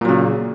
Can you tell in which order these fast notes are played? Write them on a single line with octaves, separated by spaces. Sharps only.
A#2 F#3 C#3